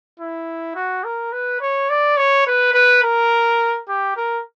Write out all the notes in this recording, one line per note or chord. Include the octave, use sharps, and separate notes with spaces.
E4
F#4
A#4
B4
C#5
D5
C#5
B4
B4
A#4
G4
A#4